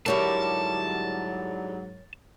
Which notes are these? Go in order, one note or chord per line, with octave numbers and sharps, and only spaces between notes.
G#2 D3 F#3 G3 E4 A#4 C#5 A5